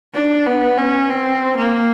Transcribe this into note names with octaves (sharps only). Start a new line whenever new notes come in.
D4
B3
C#4
C4
A#3